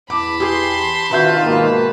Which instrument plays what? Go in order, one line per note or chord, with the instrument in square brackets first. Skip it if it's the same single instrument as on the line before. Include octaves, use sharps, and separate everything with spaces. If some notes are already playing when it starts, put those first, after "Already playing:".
[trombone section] E2 [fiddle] A5 B5 [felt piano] D6
[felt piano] G4 G#4 [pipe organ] C6
[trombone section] C3 D4 F#4 [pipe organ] D#3 F4 [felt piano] B4 E5 G6
[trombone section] G#2 B2 A#3